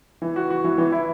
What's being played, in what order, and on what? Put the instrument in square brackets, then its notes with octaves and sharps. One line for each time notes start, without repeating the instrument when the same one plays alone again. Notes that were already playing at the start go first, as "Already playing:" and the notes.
[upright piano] E3
F#4
F#4
E3
E3
E4